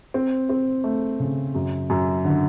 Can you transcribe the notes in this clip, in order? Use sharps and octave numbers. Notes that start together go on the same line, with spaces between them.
C4
C4
A3
C#3
F#2
F#2
D3